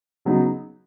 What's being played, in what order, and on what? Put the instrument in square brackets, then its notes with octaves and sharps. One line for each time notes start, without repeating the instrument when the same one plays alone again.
[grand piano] C#3 F#3 B3 D#4